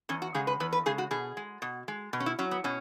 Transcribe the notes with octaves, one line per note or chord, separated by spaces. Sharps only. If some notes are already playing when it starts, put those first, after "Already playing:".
E2 C#4
F#4
C#3 G#3 G#4
B4
E2 B4
B4
C#3 G#3 G#4
F#4
B2 G#4
G#3
B2
G#3
B2
C#4
E4
F#3 C#4
B3
B2 C#4